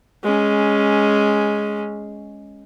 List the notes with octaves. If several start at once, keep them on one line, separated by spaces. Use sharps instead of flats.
G#3 C#4